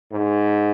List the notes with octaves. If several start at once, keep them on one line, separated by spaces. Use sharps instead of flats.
G#2